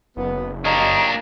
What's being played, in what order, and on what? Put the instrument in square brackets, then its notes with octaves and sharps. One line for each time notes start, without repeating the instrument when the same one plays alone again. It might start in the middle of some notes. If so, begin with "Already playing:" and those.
[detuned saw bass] F#1 [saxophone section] B3
[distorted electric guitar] A#3 D4 [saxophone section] G4 C#5 D#5 [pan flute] A#5